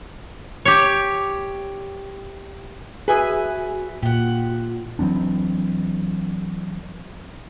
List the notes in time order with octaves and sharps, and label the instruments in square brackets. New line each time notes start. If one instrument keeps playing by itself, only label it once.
[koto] G4 C#5
[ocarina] F#4 [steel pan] G#4 [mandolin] B4 E5 G#5
[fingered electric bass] A#2 [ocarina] F4 [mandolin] G4 F#5
[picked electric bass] E3 F#3 C4 D4